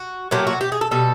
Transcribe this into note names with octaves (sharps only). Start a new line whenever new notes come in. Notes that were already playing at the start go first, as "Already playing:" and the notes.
Already playing: F#4
A#2 F#3 A3 G4
F#4
G4
G#4
A4
B2 G3 A4